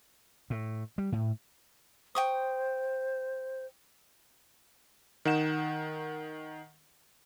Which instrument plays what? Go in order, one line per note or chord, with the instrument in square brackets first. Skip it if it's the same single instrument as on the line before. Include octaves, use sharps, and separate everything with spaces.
[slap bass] A2
G3
A2
[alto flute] C5 [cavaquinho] G5 C#6 D#6
[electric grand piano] D#3 D#4 F#5 E7